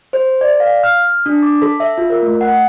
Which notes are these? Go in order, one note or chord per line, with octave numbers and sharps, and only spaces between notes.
C5
D5
F5
F6
D4
D6
A4
E5
F4
A#4
A3
F#5